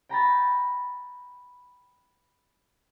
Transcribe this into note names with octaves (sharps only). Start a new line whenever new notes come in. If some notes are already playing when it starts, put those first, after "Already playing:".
G5 A#5 B5 A6